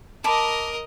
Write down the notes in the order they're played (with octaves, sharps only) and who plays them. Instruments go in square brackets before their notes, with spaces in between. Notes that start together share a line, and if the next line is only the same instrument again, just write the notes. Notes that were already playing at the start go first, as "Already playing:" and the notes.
[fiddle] A#4 D#5 [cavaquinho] A5 B5 D6